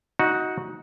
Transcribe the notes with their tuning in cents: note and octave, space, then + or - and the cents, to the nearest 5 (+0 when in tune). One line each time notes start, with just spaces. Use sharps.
D#4 +20 F#4 -5